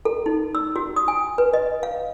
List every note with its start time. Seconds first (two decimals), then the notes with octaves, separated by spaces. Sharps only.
0.05 A4
0.26 D#4
0.55 E6
0.76 F#4
0.96 D#6
1.08 G#5
1.38 B4
1.53 D#5
1.83 F5